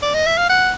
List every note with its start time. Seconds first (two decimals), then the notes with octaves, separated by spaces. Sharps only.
0.02 D5
0.14 D#5
0.26 E5
0.37 F5
0.49 F#5